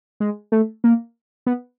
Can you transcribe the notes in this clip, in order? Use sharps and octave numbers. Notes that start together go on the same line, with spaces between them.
G#3
A3
A#3
B3